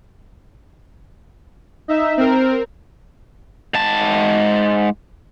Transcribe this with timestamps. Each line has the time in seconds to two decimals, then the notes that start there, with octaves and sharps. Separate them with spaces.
1.88 D#4 E5
2.17 C4 A#4
3.74 G#2 A5